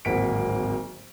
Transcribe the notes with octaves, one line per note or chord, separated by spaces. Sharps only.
D1 G#1 A#3 F#5 B6 D7